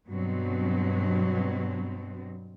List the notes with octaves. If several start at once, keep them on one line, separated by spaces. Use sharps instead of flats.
G2 B2 F#3 C4